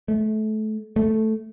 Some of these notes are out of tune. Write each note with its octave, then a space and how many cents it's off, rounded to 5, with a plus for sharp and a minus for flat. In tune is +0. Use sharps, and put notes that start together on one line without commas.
A3 -25
A3 -5